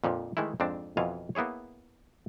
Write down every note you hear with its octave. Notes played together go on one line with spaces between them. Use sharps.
F2 A#2 D3 F3
D#3 E3 G#3 A3 E4
F2 G#2 C4 D4
F2 B2 E3 F4 F5 G#5
A#3 B3 E4 G#4 C#5